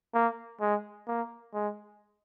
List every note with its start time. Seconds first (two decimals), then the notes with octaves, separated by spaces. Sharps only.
0.14 A#3
0.61 G#3
1.07 A#3
1.54 G#3